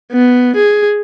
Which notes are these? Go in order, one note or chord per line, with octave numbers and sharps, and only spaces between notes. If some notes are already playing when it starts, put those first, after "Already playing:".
B3
G#4